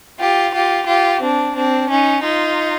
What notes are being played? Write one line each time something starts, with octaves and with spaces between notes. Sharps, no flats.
F4 G4
F4 G4
F4 G4
C4 D4
C4 D4
C#4 D#4
D#4 F4